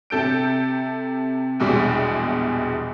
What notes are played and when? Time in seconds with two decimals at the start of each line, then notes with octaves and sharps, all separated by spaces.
0.10 C3 A4 G6 D7
1.60 A#1 E2 B2 G3 G#3